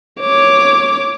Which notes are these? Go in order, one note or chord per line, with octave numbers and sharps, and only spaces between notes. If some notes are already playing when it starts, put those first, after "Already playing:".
C#5 D6